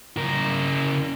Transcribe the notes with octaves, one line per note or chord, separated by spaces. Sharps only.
C#3 A#4